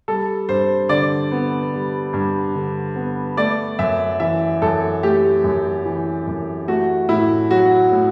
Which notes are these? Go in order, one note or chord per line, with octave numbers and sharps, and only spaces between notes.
G3 A4
G2 C5
D3 D5
B3
G3
G2
D3
B3
A3 D5
F#2 E5
E3 E5
F#2 A4
A3 G4
F#2
E3
F#2
A3 F#4
A2 E4
F#3 F#4
A2